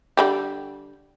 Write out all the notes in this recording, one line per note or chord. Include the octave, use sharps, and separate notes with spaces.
D3 G3 G4